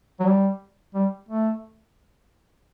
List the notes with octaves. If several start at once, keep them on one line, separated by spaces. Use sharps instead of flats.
F#3
G3
G3
A3